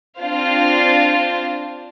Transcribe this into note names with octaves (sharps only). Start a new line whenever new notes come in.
C4 D4 F4 C5 F5